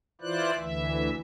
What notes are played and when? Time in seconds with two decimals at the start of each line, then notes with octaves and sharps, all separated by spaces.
0.21 E3 E4 F4 C5 D5 F#6
0.58 D2 E3 E5